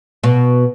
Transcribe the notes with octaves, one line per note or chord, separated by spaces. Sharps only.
B2